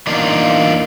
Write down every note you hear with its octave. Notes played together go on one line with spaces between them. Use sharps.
E2 A#3 D4 D#4 F4